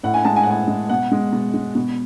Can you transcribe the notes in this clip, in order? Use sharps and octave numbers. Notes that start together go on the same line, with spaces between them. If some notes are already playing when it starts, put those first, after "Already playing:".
A2 F#5
G#5
G#3 A5
G#5
F#5
A2 G#5
G#3
B2 F#5
G#3
B2
G#3
B2